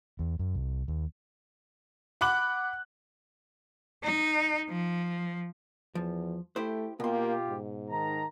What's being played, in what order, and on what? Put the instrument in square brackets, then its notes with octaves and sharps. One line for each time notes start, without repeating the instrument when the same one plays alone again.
[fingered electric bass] E2
F#2
C2
D#2
[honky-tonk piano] F#5 B5 D6 F#6 F#7
[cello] D#4
F3
[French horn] E2 [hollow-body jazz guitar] F3
[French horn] A3 [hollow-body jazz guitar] E4 G4 C5
[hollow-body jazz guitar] B2 C6 [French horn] A#3 [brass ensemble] F4 G4
[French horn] G#2
[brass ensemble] D#3 A5 A#5